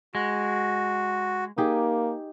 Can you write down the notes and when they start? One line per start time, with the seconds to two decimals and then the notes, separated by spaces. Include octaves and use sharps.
0.15 G#3 F#4
1.58 A#3 D#4 G4 G#4